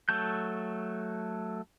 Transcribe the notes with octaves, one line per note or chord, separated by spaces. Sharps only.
F#3 A3 A4 G6